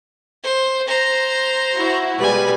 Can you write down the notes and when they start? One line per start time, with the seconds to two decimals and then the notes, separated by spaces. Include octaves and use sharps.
0.43 C5
0.87 C5 A#5
1.77 E4 F#4
2.18 B2 G3 G#3 B4 G#5